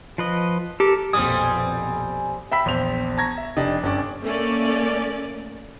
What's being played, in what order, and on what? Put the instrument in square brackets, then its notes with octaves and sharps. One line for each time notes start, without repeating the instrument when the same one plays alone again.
[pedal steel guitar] F3 B4 D#5
[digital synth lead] G4 [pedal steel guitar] A4 A#4
[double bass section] A#1 F2 B2 [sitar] G3 C4 [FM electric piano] G#5 [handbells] D#6
[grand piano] E5 G5 B5 E6 B6
A#1 E2 C5 G5 F7
A5 A#5 C#6 G#6 A#6
E5
F1 D4 D#4 G4
G1 C#4 D4 G5 D6
[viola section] A3 A#3 C#4 D5